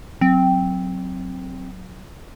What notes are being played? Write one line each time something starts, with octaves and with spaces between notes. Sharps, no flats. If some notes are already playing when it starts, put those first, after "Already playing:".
F#3 C4